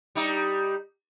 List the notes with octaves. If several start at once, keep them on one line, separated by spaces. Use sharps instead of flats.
G3 D#4